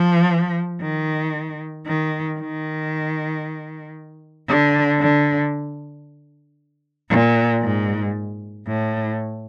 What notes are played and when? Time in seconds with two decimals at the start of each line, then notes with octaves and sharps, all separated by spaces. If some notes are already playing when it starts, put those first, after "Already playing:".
Already playing: F3
0.81 D#3
1.86 D#3
2.39 D#3
4.48 D3
5.00 D3
7.10 A#2
7.62 G#2
8.67 A2